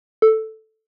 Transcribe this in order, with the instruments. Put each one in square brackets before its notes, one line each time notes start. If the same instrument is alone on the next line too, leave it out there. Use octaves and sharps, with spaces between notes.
[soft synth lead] A4